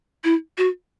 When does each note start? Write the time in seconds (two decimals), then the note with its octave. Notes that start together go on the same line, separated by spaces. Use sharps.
0.24 E4
0.58 F#4